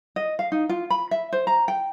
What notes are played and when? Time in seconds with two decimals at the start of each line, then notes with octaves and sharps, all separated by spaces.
0.16 D#5
0.39 F5
0.52 D#4
0.69 F4
0.90 B5
1.11 E5
1.33 C5
1.47 A#5
1.68 G5